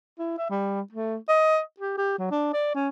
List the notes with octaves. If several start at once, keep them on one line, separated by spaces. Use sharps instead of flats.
E4
E5
G3
A3
D#5
G4
G4
F#3
D4
D5
C#4